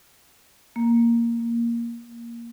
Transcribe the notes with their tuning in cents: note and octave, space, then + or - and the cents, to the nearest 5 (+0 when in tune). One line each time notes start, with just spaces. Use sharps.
A#3 +0
A#3 +10